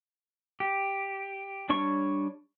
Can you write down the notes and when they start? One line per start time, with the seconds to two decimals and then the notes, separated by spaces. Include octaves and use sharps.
0.60 G4
1.69 G3 D4 C#5 C#6